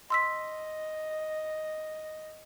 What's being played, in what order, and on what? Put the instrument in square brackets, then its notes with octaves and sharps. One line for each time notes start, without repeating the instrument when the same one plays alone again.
[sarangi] D#5 [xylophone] C6 E6 B6